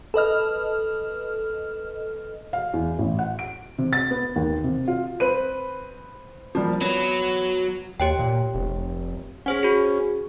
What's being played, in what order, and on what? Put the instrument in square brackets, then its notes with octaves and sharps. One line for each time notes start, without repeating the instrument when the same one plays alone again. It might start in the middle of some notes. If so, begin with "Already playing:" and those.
[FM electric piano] A4 B4 D#5 F6
[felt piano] F5
E2
A1
F#5
D7
C3
A6
B3
D#2
C3
F4
[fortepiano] C4 B4 [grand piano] D#7
[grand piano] F3 G3 A#3
[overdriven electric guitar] F#3 [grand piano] B3
[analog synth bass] D#2 [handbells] G4 C#5 G5
[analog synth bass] A#2
F1
[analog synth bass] C#4 [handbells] G#4 C5 F#5
[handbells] F#4 G#4